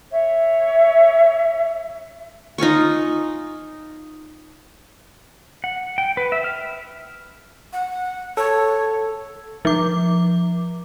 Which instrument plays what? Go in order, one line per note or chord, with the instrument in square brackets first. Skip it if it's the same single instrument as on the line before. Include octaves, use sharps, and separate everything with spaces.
[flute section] C#5 E5
[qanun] D#4 F4 G#5 C#6
[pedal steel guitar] F#5
G5
B4
E5
F6
[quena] F#5
[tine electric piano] A4 [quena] C#5
[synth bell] F3 D6